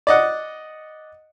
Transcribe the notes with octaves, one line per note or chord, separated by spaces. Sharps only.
D5 D#5 F#5